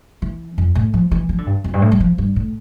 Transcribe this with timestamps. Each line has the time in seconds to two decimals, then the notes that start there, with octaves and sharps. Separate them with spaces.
0.22 E3
0.58 F2
0.75 A2
0.94 F3
1.11 E3
1.29 F3
1.38 D3
1.47 G2
1.64 F2
1.74 G2
1.82 A2
1.92 G3
2.00 F3
2.18 G2
2.36 A2